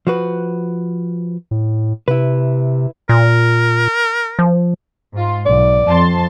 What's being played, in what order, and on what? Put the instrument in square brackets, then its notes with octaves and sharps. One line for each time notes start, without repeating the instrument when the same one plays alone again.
[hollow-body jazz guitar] F3 F#4 B4
[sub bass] A2
[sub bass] C3 [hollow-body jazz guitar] E4 B4
[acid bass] A#2 [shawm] A#4
[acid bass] F3
[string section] G#2 F4
[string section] B1 [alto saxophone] D5
[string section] F2 A5 C6